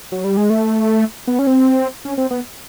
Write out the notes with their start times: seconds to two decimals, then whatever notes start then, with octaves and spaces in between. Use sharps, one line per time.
0.12 F#3
0.24 G3
0.37 G#3
0.50 A3
1.27 B3
1.39 C#4
1.47 C4
2.05 C#4
2.18 C4
2.31 B3